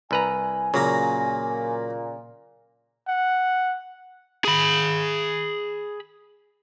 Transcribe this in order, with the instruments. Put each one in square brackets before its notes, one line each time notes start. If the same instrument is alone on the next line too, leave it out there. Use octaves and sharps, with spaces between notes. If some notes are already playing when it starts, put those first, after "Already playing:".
[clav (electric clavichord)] C2 B4 A#5 [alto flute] G#5
[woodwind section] A#2 [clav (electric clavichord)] C#3 [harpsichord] F#3 A#3 A#5
[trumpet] F#5
[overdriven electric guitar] G#4 B5